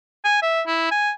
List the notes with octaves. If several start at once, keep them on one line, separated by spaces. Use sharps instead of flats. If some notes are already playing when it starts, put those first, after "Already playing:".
G#5
E5
E4
G#5